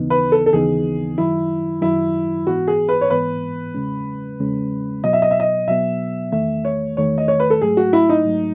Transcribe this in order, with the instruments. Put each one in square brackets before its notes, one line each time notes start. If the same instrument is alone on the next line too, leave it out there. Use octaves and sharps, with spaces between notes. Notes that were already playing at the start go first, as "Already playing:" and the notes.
Already playing: [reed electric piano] D#2 C#3 E3 B3 D#4
[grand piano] B4
A4
A4
[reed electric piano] D#2 C#3 E3 B3 D#4 [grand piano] G#4
[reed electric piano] F#2 D#3 F#3 [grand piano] E4
[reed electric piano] F#2 D#3 F#3 [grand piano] E4
[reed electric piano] G#2 E3 B3 [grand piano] F#4
[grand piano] G#4
B4
C#5
[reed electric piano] G#2 E3 B3 [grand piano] B4
[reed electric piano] E2 C#3 G#3 C#4
E2 C#3 G#3 C#4
[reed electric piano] B2 F#3 B3 [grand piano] D#5
[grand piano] E5
D#5
E5
D#5
[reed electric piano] B2 F#3 B3 [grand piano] E5
[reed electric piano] E2 D#3 A3 [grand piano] E5
[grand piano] C#5
[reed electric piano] E2 D#3 A3 [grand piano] C#5
[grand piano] D#5
C#5
B4
A4
[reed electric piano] G#2 F#3 A3 [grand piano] G#4
[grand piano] F#4
E4
D#4
[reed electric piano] G#2 F#3 A3